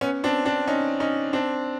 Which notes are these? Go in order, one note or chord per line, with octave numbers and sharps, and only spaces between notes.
B3 C#4
C4 D4
C4 D4
C#4 D#4
C#4 D#4
C4 D4